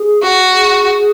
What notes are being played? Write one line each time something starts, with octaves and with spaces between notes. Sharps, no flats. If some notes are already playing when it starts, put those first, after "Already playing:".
Already playing: G#4
F#4
G#4